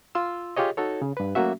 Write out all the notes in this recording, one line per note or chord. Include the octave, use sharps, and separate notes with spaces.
F4 C6 E6
F4 G4 G#4 C#5 D#5
D#4 F#4 A4 C#5
C#3
G2 B4
F#3 A3 A#3 C#4 F#4 E5